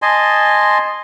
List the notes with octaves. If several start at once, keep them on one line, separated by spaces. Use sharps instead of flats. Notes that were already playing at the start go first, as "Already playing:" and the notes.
D#5 G#5 A5 C6